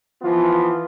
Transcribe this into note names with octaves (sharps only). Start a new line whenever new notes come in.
E3 F3 B3 F4